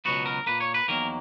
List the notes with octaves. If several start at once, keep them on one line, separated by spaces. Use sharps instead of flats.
C#2 B2 F#3 B3 F#4
A#4
A#2 A#3 B4
C#5
B4
E2 D#3 F#3 A#3 A#4